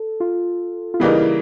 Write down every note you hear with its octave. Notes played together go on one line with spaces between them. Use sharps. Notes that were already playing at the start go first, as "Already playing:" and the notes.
Already playing: A4
F4
F4
C#3 E3 G3 A#3 D#4 E4